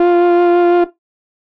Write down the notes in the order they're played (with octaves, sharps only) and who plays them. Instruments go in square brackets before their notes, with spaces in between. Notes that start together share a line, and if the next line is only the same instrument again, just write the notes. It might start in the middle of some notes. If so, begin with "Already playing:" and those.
Already playing: [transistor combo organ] F4